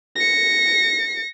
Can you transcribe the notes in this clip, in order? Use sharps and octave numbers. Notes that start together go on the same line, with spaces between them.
A#6 C#7